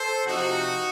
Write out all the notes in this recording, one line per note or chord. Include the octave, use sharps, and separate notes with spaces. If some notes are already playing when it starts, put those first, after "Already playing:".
Already playing: A4 C5
C3 F3 D#4 F#4